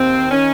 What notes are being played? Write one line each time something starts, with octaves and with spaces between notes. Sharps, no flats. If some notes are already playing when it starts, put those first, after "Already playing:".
Already playing: D#2 C4
D#3 C#4